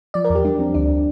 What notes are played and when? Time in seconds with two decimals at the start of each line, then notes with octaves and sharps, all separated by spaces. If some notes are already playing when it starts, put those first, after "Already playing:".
0.14 F3 D5
0.25 A#4
0.30 E2
0.35 G4
0.45 G3 D4
0.59 F2 C4
0.74 D2 D4